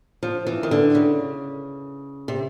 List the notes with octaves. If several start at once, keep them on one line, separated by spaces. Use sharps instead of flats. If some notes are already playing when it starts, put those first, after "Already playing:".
F3
E3
D#3
D3
C#3
C3